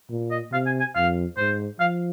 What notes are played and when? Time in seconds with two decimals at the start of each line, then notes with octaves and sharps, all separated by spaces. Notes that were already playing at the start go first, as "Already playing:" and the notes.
0.10 A#2
0.31 D#5
0.52 C3 F5
0.66 G#5
0.80 G#5
0.95 F2 F5
1.37 G#2 C5
1.79 F3 F5